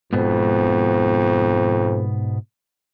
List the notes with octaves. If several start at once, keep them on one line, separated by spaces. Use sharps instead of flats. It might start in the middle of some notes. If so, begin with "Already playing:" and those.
F2 G#2 B2 B3